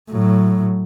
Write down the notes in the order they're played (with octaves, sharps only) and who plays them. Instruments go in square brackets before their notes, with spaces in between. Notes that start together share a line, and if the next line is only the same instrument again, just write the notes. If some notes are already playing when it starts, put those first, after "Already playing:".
[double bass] A2 F#3